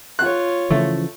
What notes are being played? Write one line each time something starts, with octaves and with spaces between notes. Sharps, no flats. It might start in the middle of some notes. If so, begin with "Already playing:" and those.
F4 C#5 F#6
C#3 E3 F3 A3